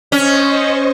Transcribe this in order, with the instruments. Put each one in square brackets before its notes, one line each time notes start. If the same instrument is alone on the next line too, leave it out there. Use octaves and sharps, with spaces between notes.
[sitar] C#4 [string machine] C5 D#5 C#6